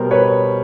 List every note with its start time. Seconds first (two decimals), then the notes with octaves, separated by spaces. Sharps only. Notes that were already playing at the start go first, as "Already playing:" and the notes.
Already playing: B2 G3 B3 A#4 C5
0.11 B4 C#5